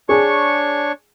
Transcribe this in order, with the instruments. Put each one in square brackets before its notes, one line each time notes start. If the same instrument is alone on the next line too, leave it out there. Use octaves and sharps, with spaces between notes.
[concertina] D4 C#5 C#6 [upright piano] G#4